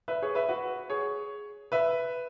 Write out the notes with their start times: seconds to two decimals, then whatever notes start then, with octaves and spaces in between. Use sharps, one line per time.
0.08 B4 E5
0.22 G#4 C#5
0.35 B4 E5
0.49 F#4 B4
0.90 G#4 C#5
1.72 B4 E5